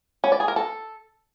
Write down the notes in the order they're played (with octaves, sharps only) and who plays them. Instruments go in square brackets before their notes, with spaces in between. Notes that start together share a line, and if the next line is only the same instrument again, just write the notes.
[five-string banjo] C#4
D5
G#4
A#4
A4